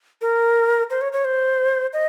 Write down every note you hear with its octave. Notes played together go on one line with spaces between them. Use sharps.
A#4
C5
C#5
C#5
C5
D#5